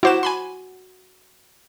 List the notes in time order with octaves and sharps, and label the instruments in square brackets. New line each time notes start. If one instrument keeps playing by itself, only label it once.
[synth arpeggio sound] E4 C5 E7 [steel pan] F#4 D6
[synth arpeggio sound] G#5 B5 C6